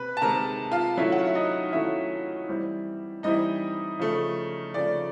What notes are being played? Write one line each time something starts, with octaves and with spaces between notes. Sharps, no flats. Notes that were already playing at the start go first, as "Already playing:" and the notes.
Already playing: C3 B4 B5
A5
C3 D#3 G#3 A#4 A#5
F4 F5
D#3 F#3 A3 C#4 E4 F4 E5
F#5
F5
E5
D#4 D#5
D#3 F#3 A3 C#4 E4 F4 E5
E3 G3 C4 E4
E3 G3 C4 D#4 E4 D#5
C#3 F3 A3
C#3 F3 A3 D5